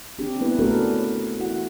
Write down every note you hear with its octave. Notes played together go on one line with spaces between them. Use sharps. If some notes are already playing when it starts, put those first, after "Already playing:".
C4 D4 G4
B3 E4 B4
A3 C#4 D4 F#4 A4 A#4
C#5
E4 F#4 F#5